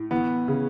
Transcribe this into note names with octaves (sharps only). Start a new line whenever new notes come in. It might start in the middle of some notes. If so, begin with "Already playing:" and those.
Already playing: A2
E3 B3
C#3